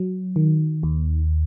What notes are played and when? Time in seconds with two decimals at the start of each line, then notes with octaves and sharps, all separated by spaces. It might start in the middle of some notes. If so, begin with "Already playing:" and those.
Already playing: F#3
0.36 D#3
0.83 D#2